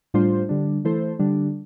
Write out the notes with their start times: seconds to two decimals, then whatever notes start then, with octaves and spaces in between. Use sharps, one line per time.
0.14 A2 G3 D4 F4 C5
0.49 D3 G3 D4
0.84 E3 A3 E4 A4 C5
1.19 D3 G3 D4